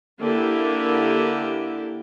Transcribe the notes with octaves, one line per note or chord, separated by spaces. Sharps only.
D3 A#3 E4 G4 A#4